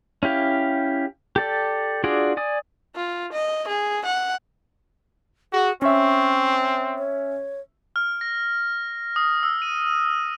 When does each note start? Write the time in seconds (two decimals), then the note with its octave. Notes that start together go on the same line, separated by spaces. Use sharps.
0.23 C#4 E4 G4 F5
1.36 G4 A4 D5
2.04 D4 F4 F#4 G#4 D5
2.37 D5 G#5 D#6
2.95 F4
3.32 D#5
3.67 G#4
4.05 F#5
5.53 F#4 G#4
5.82 C4 C#4 E5 C#6
6.98 C#5
7.96 F6
8.21 A#6
9.16 D#6
9.43 E6
9.62 D#7